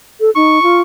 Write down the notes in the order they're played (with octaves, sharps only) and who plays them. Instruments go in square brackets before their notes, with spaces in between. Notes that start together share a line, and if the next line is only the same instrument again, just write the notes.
[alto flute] A4
[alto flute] D#4 [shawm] C#6
[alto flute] F4